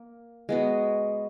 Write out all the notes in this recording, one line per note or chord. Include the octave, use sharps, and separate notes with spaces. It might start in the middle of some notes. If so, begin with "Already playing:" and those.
Already playing: A#3
G#3 B3 F#4